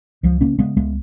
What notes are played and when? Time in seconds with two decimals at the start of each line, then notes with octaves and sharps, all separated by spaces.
0.23 C#2 F3
0.41 C#3 A#3 C#4
0.59 C#3 G#3 B3
0.76 C#2 G#3 B3